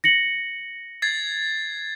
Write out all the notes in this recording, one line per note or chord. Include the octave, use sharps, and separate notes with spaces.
A#6 C#7 F#7
G#6 A6 C7